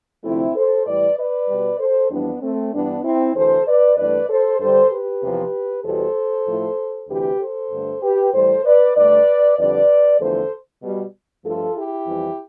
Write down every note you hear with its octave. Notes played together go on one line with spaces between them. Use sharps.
D2 C3 F3 A3 C4 E4
A4 C5
A2 E3 G3 B4 D5
B4 D5
B2 G3
A4 C5
F2 E3 G3 B3 D4
A3 C4
G2 E3 G3 B3 D4
C4 E4
D2 C3 E3 A4 C5
B4 D5
G2 E3 A3 B4 D5
A4 C5
G2 D3 G3 A4 C5
G4 B4
E2 C3 F3
E2 B2 G3 A4 C5
A2 F3 A3
D2 C3 E3 G4 B4
A4 C5
G2 D3 A3
G4 B4
A2 E3 G3 A4 C5
B4 D5
G2 D3 A3 B4 D5
F2 D3 G3 B4 D5
E2 D3 F3 A3 A4 C5
B2 G3
G2 F3 A3 F4 A4
E4 G4
F2 E3 G3